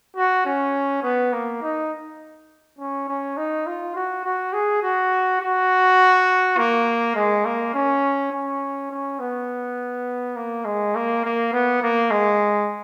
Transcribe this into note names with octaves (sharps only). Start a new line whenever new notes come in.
F#4
C#4
B3
A#3
D#4
C#4
C#4
D#4
F4
F#4
F#4
G#4
F#4
F#4
A#3
G#3
A#3
C#4
C#4
C#4
B3
A#3
G#3
A#3
A#3
B3
A#3
G#3